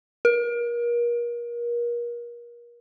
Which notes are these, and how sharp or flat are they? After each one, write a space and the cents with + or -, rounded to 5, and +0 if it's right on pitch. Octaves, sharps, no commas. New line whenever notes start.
A#4 +35